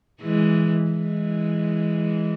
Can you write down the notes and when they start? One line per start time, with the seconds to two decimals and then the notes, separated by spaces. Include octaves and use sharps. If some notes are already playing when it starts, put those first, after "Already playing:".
0.21 E3 G#3
0.90 E3 G#3